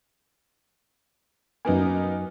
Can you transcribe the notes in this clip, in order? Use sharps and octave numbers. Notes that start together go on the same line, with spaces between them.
F#2 A#3 B3 D#4 G#5